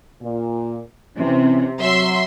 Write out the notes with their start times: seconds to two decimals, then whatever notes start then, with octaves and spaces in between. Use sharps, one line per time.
0.22 A#2
1.17 C3 E3 C#4
1.81 F#3 E5 C6